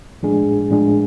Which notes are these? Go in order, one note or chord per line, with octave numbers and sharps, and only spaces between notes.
A2 F3 G#3 D4 G#4
A2 F3 G#3 D4 G#4